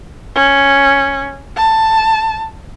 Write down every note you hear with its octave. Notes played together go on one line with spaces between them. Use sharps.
C#4
A5